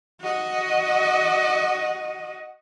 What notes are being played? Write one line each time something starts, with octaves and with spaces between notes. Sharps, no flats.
F#4 D#5